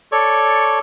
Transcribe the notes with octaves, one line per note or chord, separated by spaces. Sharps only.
A4 C#5 D5 C#6